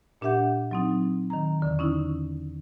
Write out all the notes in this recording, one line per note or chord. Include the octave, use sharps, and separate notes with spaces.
A#2 D4 G4 E5 F#5 G6
F#3 C4 D#4
D#3 A#5
E2 D3
C#4 D#4 E4